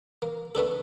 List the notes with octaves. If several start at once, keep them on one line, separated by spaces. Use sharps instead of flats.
A#3
A3 B3 D4 A4